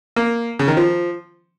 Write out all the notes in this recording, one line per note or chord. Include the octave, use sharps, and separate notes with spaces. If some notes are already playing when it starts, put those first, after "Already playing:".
A#3
C#3
D#3
F3